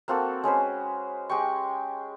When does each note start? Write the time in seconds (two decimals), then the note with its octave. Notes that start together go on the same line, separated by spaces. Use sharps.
0.08 A#3 C4 F#4 A4
0.44 G#3 C#4 B4 C5
1.29 G#3 G4 G5 C#6